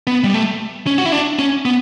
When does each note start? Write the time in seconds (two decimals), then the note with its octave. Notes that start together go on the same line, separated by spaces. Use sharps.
0.07 B3
0.24 G3
0.34 A3
0.87 C#4
0.98 F#4
1.05 E4
1.12 D4
1.39 C#4
1.65 B3